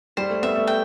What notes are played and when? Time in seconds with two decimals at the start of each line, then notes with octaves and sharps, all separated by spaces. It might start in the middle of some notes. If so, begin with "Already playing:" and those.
0.17 G3 C5
0.30 A3
0.42 B3 E5
0.55 A3
0.67 G5